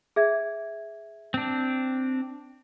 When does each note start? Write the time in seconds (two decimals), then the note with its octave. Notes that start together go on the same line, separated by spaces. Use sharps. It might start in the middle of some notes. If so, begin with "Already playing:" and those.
0.16 G#4 E5 G#6
1.34 C4 D4